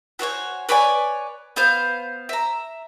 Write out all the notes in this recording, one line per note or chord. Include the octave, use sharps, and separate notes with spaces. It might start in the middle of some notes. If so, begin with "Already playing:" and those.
F#4 C5 C#5 G#5
B4 C#5 D5 G#5
B3 C5 F5
E5 A#5